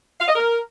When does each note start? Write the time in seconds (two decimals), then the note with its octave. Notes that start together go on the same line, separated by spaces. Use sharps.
0.21 F5
0.28 D#5
0.36 A#4